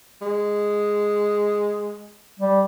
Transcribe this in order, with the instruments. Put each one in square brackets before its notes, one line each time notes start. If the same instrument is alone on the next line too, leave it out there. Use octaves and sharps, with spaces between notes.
[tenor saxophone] G#3
[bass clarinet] G3